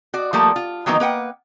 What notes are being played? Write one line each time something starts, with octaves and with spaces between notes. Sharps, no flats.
F#4 D5
F3 G3 A3 A#3
F4
D#3 E3 F#3 A#3 B3 D#4
A#3 B4 F#5 G5